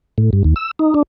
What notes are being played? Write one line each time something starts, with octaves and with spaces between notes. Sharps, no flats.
A2
G2
D#2
E6
D#4
D4